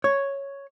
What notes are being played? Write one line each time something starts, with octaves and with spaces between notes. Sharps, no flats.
C#5